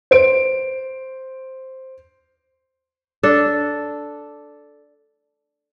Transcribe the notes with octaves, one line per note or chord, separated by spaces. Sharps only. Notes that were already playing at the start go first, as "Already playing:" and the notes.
C5 D7
D4 A4